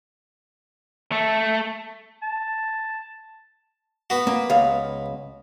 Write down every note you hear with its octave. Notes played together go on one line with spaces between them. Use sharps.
A3
A5
B3 F#4
A#3
C#2 F5